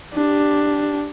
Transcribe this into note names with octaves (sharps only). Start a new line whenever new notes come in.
D4 G4